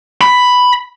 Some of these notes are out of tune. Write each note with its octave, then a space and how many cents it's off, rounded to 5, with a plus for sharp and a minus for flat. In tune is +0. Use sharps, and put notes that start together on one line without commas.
B5 +5